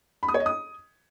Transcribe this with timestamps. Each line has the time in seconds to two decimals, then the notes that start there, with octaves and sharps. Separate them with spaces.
0.23 B5
0.28 D#6
0.34 C#5
0.40 D#5
0.46 D#6